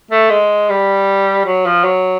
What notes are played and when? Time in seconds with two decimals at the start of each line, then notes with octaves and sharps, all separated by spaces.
0.11 A3
0.30 G#3
0.69 G3
1.45 F#3
1.66 F3
1.84 F#3